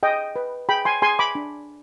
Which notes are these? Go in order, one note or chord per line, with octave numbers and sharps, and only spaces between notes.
G#4 D#5 G5
B4
G#4 G5 B5
G#5 C6
G#4 G#5 C6
B5 D6
D4